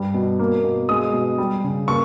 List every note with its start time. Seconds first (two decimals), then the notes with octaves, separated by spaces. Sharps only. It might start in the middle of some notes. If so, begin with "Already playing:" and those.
Already playing: G2 G3
0.14 B2
0.39 A#3
0.64 B2
0.89 G#3 D#6
1.13 B2
1.38 G3
1.64 C#3
1.88 A#3 C#6